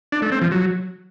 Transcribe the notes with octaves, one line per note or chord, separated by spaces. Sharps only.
D4
A3
C4
F3
F#3